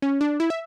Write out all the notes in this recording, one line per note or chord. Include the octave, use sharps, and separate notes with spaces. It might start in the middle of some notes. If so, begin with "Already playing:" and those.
C#4
D4
E4
E5